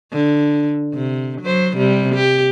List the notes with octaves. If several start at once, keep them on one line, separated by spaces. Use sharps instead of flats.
D3
C3
F#3 C5
C3 G3
G4